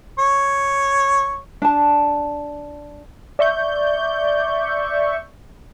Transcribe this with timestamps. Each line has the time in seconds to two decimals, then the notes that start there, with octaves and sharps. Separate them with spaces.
0.19 C#5
1.62 D4 A5
3.39 D5 E5 C#6 G6